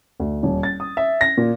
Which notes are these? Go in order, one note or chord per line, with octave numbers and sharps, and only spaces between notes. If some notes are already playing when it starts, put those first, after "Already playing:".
D2
D#1
A6
D#6
E5
A#6
A#2